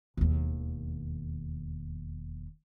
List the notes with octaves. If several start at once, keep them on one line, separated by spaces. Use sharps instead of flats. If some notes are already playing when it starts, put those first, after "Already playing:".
E1 D#2